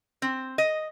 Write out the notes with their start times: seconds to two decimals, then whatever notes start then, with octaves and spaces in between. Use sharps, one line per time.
0.22 C4
0.58 D#5